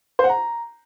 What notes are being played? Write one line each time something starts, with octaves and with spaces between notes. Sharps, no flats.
C5
F#5
A#5